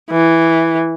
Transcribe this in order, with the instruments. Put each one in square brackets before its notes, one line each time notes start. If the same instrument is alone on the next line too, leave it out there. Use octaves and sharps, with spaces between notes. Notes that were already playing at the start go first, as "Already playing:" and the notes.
[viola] E3